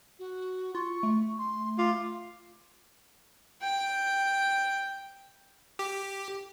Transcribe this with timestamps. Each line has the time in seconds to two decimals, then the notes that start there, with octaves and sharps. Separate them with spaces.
0.19 F#4
0.75 F4 C#6
1.03 A3
1.39 C6
1.78 F4 D6
3.62 G5
5.79 G4